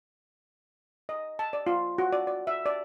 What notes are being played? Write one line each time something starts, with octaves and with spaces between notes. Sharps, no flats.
D#5
A5
D5
F4
F#4
D5
D5
E5
D5